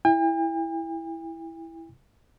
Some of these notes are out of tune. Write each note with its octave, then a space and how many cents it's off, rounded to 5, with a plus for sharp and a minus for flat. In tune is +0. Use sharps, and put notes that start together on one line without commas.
E4 +0 G5 +45